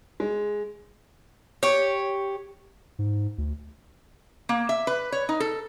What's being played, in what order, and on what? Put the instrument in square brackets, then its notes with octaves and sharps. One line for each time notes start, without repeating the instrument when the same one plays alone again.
[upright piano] G#3
[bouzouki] G4 C#5
[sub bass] G#2
D2
[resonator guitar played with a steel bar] A#3
E5
B4
C#5
D#4
A4